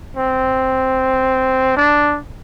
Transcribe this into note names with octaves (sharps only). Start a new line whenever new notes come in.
C4
D4